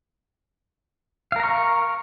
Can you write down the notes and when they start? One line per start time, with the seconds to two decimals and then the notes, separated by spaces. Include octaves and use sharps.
1.32 F5
1.36 A#4
1.40 A#5
1.43 C#6